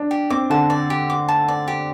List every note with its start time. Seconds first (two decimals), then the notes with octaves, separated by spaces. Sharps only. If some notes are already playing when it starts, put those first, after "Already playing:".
Already playing: D4
0.11 G4
0.30 C4 D6
0.50 D3 A5
0.70 D5
0.90 G4
1.10 D6
1.29 A5
1.48 D5
1.68 G4